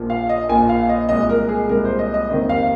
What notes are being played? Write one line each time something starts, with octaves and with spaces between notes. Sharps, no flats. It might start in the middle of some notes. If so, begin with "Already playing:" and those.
Already playing: A#1 A#2 F3 A#3
F5
D#5
A#1 A#2 F3 A#3 G#5
F5
D#5
C2 A#2 G#3 D#5
A#4
G#4
C2 A#2 G#3 A#4
C5
D#5
D#5
F1 D#2 D#3 C4 D#5
F5